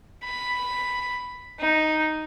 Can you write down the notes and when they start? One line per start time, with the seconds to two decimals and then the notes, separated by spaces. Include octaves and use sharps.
0.25 B5
1.60 D#4